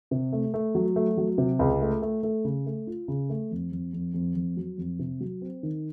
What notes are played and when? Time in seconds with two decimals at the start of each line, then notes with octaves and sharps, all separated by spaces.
0.11 C3
0.33 A3
0.54 A3
0.75 F#3
0.96 A3
1.18 F#3
1.38 C3
1.59 C#2
1.81 A3
2.02 A3
2.23 A3
2.45 C#3
2.66 A3
2.87 F4
3.08 C#3
3.29 A3
3.51 F2
3.72 F2
3.93 F2
4.14 F2
4.35 F2
4.57 F#3
4.78 F2
4.99 C3
5.20 F#3
5.42 C4
5.63 D#3